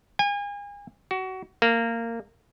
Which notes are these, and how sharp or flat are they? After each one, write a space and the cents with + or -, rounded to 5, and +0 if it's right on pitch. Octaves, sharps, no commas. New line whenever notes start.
G#5 -35
F#4 +25
A#3 -20